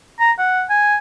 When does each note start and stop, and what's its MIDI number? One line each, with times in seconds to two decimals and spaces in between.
0.20 0.31 82
0.39 0.64 78
0.70 0.97 80